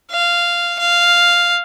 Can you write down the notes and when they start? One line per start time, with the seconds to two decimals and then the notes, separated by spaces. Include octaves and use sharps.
0.11 F5
0.80 F5